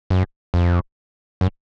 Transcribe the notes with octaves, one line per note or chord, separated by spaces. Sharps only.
F#2
F2
F#2